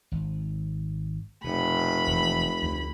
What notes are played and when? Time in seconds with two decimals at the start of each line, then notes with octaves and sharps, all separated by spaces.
0.12 G#1
1.44 F1 B2 B5
2.07 E1 C3
2.62 D2